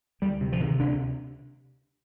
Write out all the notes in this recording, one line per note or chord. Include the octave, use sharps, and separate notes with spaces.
D2 G3
C3
F3
C3 D#3
D2 D4